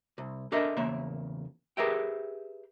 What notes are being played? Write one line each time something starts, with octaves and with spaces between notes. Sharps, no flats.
C2
D4 A4 A#4 D#5 E5
E2 C#3 A#3 E5
G4 G#4 A#4 B4 E5 G5